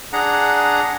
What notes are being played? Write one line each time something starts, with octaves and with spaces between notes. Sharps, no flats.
D4 G#4 F#5 A#5